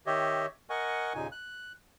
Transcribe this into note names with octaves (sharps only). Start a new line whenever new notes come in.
D#3 G4 C#5 D#5 E5
A#4 D#5 F#5 G#5 C#6
D#2 A#2 C#3 D#4 G#5
F#6